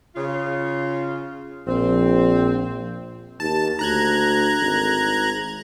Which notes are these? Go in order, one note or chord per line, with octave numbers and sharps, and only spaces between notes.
C#3 F4
A#1 C4
D#2 A5
D2 A#5 F#6 G#6
G#1